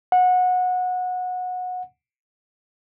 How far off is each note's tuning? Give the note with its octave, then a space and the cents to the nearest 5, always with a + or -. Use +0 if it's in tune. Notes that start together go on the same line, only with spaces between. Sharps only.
F#5 -20